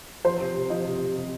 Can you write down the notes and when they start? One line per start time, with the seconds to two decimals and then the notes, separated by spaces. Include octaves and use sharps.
0.25 F3 C5
0.40 C3
0.55 C3
0.70 F3 D#5
0.85 C3
1.00 C3
1.15 C3